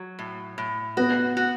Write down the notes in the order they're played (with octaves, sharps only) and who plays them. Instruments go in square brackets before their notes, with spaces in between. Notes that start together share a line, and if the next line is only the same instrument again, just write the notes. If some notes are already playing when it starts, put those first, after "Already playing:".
Already playing: [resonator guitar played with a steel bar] F#3
A2
A2
[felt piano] B3 [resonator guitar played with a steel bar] F#4
[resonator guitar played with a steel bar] F#4